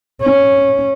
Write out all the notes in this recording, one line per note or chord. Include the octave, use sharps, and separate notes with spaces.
C#4